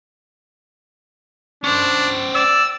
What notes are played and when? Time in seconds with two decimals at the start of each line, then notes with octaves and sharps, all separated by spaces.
1.64 C#4 D4 C5
2.35 D5 E6